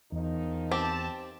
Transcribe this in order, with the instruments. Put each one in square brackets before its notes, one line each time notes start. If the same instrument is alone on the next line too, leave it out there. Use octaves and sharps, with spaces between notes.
[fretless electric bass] E2 [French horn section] D#3 F3 D#4
[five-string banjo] C4 G4 [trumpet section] A5